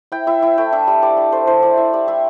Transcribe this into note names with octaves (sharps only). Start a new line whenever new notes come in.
E4 G5
E4 E5
E4 E5
A3 G5
D4 E5
G3
G3 D5
D4
A3 C5
E4 C5
E4 D5
E4 E5
G3 D5
G3 E5